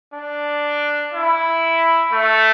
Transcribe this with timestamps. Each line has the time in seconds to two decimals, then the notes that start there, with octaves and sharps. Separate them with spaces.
0.13 D4
1.13 E4
2.13 A3